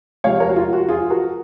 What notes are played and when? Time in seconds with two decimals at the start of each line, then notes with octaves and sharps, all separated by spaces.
0.24 C3 F3 G#3 C#5 F5
0.40 A#4 C#5
0.49 F#4
0.56 F4
0.73 F#4
0.89 F4 G#4
1.10 F#4 A#4